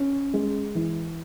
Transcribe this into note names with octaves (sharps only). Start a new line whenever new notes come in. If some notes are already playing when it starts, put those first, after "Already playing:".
Already playing: C#4
G#3
E3